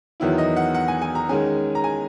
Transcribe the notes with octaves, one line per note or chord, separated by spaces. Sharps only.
E2 D#3 F#3 B3 E4
D#5
F#5
F#5
G#5
G#5
A#5
D#3 G#3 C#4 G#5
A#5
G#5